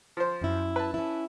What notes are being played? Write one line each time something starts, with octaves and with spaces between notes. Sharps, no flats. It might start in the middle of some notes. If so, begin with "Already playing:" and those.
F3 C5
F#2 E4
B4 A5
C#4 E4